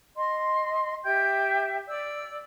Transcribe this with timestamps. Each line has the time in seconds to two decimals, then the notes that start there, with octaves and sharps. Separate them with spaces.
0.15 D#5 C6
1.03 G4 E5 G5 G6
1.87 D5 E6